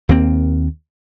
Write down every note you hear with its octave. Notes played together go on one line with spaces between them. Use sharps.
D#2 A#3 C4